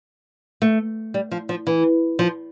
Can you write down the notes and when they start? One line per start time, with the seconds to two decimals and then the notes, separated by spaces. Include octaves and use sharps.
0.62 A3
1.14 G3
1.31 F3
1.49 F3
1.67 E3
2.19 F3